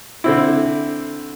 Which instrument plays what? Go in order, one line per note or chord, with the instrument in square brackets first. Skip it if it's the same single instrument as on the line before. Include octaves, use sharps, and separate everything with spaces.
[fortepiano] D3 C4 E4